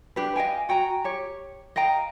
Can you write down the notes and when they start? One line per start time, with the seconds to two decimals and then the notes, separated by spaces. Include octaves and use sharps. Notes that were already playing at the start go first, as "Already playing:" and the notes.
0.16 D4 G4 B4
0.36 D#5 F5 G5 G#5
0.69 F#4 G5 G#5 A#5
1.04 G4 C#5
1.76 D#5 F5 G5 A#5